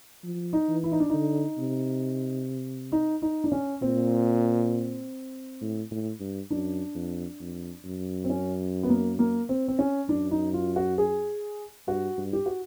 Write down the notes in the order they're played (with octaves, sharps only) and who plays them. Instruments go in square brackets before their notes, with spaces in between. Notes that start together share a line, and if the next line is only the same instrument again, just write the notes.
[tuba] F3
[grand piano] D#4
[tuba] E3
[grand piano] E4
D#4
D4
[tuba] D3 [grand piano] D#4
[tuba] C3
[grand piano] D#4
D#4
D4
C#4
[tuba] A#2 [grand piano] C4
[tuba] A2
A2
G2
[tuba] F#2 [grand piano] D4
[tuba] F2
F2
F#2
[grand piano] C4
C#4
B3
A#3
A#3
C4
C4
C#4
[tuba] F#2 [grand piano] D4
[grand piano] D#4
F4
F#4
G#4
[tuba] G2 [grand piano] F#4
[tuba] G2
[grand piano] G4
F#4